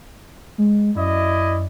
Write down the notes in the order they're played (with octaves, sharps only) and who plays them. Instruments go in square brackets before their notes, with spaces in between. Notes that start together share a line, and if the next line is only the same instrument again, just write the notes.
[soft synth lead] G#3
[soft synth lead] F#2 [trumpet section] E4 D5 D#5